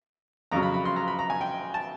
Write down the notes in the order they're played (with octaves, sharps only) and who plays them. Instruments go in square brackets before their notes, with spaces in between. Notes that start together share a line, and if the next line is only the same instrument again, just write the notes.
[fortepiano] F2 C#3 F#3 A#5
B5
B5
C6
A#5
B5
A#5
G#5
G5
A5